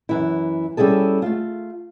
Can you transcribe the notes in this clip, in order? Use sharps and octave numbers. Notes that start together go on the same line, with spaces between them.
F#2 E3 E4
G3 C#4 E4 G#4 A4
A3 F4